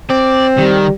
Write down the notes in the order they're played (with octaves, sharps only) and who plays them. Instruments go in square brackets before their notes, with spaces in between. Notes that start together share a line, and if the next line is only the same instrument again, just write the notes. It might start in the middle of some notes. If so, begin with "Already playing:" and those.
[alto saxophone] C4 [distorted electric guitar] D5
[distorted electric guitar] D#3 [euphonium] G3